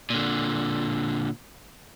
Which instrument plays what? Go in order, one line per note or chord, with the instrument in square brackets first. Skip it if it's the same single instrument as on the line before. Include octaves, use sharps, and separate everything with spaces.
[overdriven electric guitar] A#2 D3